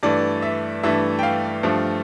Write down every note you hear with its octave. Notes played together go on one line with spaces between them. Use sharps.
G2 E3 A3 D5
E5
G2 E3 A3 E5
G5
F5
G2 F3 A3